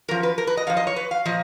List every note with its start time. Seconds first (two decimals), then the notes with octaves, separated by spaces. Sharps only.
0.08 F#2 F3 A#4
0.23 B4
0.38 A#4
0.47 B4
0.57 D#5
0.67 F#2 F3 F5
0.77 D#5
0.87 C#5
0.96 B4
1.11 F5
1.25 A#2 F3 D#5